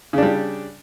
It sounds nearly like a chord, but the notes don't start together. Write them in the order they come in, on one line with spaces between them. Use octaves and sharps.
C#3 D4 G3